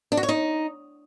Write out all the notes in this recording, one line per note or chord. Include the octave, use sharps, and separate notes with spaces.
D4
F#4
C#5
D#4